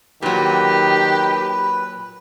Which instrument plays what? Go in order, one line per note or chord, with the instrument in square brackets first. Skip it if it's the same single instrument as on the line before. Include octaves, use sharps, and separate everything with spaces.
[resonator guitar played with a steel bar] A#2 F#3 [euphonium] D#3 [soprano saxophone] G4 [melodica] B4